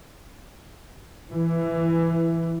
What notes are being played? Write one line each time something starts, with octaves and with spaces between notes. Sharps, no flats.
E3